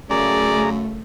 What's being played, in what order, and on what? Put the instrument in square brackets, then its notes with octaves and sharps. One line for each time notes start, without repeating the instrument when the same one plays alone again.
[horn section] F#2 C#3 [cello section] A3 [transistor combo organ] G#4 A#5 [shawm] D5